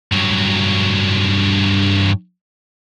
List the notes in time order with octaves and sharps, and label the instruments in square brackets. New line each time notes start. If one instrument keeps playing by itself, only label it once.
[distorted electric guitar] G2 F#3